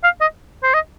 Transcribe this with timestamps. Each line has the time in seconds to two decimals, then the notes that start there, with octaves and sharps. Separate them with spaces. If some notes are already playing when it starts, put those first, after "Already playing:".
0.04 F5
0.21 D#5
0.63 C5
0.74 D#5